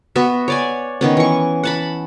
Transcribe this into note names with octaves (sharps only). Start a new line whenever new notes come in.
B3 F#4 E5
C#5 D5 G#5
D#3 B3 C#4
E3 C#6
F#5 A5 B5